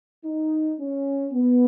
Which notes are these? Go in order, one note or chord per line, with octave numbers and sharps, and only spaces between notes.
D#4
C#4
B3